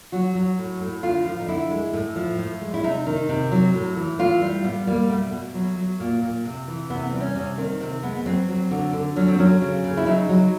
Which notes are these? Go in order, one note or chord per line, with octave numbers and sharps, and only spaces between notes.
F#3 F#4
F#3
A2
A2
D3 F4
F3
D#4
D3 E4
G#3
A2
F3
A2
G#3
E4
C3 D#4
D#3 D#4
C3
F#3
A2
E3
A2 F4
G3
G3 B3
G3 A#3
B2 A3
B2
F#3
F#3
A#2
A#2
C3
E3
C3 B3
C4
G3
C#4
C3 C#4
D#3 C4
C3 C4
G#3 B3
B3
F#3 C4
F#3
D3
D3
F#3 C#4
C4
F#3 C#4
C#3
C#3
E4
F#3 D#4
F#3